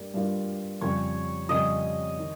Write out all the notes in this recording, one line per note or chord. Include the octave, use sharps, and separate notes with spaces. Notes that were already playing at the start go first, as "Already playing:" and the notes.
Already playing: G2 G3 A#3
G2 G3 A#3 F4
F2 C#3 G3 C4 G4 C#5
F2 C#3 G3 C4 G4 D#5
D#3